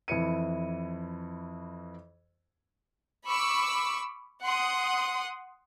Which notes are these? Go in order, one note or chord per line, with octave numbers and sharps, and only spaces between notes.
F2 E3 E4 B4 C#7 D#7
B5 C#6 D6 E6
F#5 C6 D#6